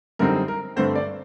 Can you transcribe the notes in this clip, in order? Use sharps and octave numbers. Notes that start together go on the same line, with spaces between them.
F#2 D3 G3 C4 D#4 A#4
A#4
G2 D3 A3 C4 C5
D5